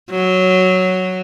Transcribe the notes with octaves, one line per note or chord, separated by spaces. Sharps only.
F#3